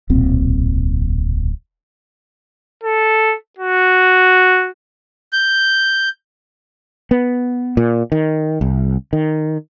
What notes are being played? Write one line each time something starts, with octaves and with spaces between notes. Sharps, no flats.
D1 B1 A#2 C4
A4
F#4
G6
B3
A#2
D#3
C2
D#3